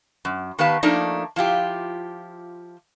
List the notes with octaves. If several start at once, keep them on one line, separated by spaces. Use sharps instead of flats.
F#2
D#3 B3 G4 B4 F5 A5
F3 A3 A#3 D4 D#4
F3 E4 F4 G4